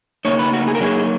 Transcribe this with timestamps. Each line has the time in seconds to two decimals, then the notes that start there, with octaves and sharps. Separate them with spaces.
0.25 C#3 F3 A#3 D#4 C#5
0.39 B4
0.53 F#4
0.68 G#4
0.75 A#4
0.81 F#3 A#3 D#4 G#4